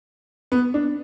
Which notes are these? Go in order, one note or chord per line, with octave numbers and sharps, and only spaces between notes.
B3
D4